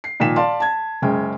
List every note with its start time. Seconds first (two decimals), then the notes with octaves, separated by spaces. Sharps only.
0.04 C7
0.20 A#2 D#3 F3 B6 E7
0.36 D5 F5 A5 C6
0.60 A5 G#6
1.02 F#1 G#3 C#4 G5